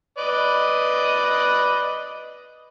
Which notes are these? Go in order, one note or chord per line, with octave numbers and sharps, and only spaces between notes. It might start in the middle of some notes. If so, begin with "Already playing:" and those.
B4 D5 D#5